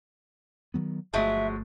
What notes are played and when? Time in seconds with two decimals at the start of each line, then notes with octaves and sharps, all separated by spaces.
0.74 D#3 F#3 B3
1.13 G1 F3 F#3 G#3 A3 E5